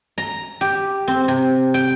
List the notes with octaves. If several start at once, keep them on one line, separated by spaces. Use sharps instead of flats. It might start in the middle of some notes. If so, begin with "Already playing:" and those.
A#5
G4
C4
C3
G5